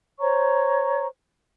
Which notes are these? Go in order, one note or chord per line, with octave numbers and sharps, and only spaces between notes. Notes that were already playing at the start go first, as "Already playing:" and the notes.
C5 C#5 A#5 C#6